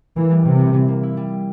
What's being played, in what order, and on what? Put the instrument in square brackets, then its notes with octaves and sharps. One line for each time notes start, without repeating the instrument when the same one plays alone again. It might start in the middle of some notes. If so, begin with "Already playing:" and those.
[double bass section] E3 [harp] A#3
[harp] G3
[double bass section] C3 [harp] A#3
[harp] E3
E3
A#3
E4
G3